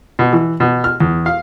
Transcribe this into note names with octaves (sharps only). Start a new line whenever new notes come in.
B2
E3
B2
F6
E2
F5